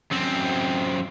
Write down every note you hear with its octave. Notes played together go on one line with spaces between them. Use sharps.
F#2 C4